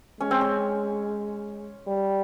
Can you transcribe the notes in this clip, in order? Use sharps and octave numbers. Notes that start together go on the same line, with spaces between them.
G#3 C#4
C4
C#4
G3